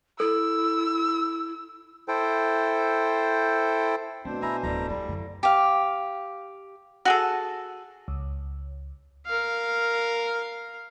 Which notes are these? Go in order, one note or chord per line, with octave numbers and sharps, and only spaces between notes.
E4 A4 E6
E4 A4 C5 G5
B2 A3 C4 D4 C5
C#4 E4 G#5 A#5
D1 F2 E4 A4 D5 A#5
G3 A3
F#2 D3
G4 F5
F#4 G#4 A4
C#2
A#4 F5